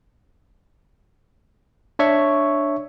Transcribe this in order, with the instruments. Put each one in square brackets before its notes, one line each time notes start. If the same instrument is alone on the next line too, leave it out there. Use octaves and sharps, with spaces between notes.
[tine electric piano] D4 C#5 E5 C#6